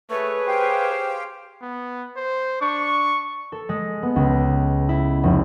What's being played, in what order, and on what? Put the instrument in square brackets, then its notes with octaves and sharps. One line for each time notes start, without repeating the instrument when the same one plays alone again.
[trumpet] A3 [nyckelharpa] G#4 C#5 [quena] B4
[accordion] G4 F5 G5 [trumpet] C5
[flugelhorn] B3
C5
[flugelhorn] D4 [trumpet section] C#6
[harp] A4
G#3
B3
C#2
E4
F1